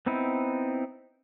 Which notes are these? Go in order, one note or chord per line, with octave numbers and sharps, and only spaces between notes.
B3 C4 D#4 E4